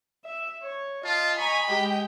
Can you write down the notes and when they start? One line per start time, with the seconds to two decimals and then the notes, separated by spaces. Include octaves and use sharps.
0.25 E5
0.63 C#5
1.05 F4 D#5 A5
1.38 G#5 A#5 B5 C#6
1.68 G#3 G4 G5